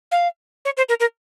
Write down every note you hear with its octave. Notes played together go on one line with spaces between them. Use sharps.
F5
C#5
C5
A#4
A#4